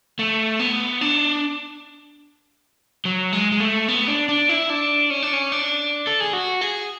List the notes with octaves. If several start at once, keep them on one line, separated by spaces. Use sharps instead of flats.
A3
B3
D4
F#3
G#3
G#3
A3
B3
D4
D4
E4
D4
C#4
D4
C#4
D4
A4
G#4
F#4
G#4